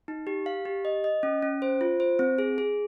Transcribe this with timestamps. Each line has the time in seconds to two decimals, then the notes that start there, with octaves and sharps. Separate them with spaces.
0.08 D#4
0.27 G4
0.46 F5
0.65 G4
0.85 D#5
1.04 D#5
1.23 C#4
1.42 C#4
1.62 C5
1.81 F4
2.00 C5
2.19 C4
2.38 G#4
2.58 G#4